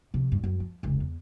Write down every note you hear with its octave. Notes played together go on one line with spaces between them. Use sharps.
C3 F3
G2
F#2 F#3
F3
F1 C#2
E2